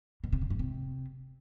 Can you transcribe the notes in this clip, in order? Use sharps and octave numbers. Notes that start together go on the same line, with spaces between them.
B2
C3
C#3
G2
C3